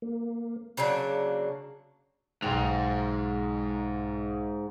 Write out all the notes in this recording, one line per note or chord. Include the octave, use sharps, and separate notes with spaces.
A#3
C#3 F#3 A#3 D4
B1 G#2 G5 F7